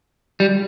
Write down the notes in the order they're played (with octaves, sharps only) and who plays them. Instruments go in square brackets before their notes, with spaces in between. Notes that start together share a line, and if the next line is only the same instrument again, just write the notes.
[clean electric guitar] G3